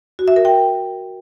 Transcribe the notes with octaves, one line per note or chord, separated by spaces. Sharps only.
F#4
E5
A#4
G5